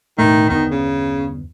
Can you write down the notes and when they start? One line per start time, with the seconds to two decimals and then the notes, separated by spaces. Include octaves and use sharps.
0.18 E1 A2 D#3 A3
0.49 G1 E2 D#3 B3
0.71 C#3